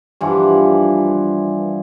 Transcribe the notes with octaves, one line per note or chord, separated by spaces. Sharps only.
G2 E3 F3 F#5